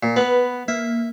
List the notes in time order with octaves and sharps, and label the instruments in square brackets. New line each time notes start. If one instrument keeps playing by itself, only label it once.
[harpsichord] A#2
[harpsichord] B3 [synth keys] B4 B5
[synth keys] A#3 [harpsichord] E5